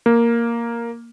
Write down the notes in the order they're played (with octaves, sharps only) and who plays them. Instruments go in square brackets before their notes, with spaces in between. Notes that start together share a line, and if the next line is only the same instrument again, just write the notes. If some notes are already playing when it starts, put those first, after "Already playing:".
[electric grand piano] A#3